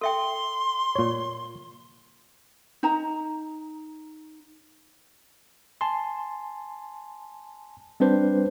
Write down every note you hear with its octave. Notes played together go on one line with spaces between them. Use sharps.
A4 E5 G5 C6
A#2 C#5
D#4 A#5
G#5 A5 C6
G3 C4 D4 B4 C5